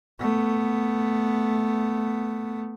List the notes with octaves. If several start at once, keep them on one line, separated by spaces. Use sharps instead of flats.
A3 B3